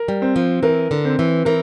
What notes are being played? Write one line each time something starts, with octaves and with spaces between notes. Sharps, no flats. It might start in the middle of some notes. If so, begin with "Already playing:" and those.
Already playing: A#4
G3
C4
F3
E3 A#4
D3
C4
E3
E3 A#4